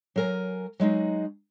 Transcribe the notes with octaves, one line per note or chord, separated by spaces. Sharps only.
F#3 A#4 G#5
F#3 G#3 D#4 F#4